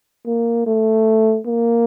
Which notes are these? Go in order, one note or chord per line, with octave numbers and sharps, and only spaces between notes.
A#3
A3
A#3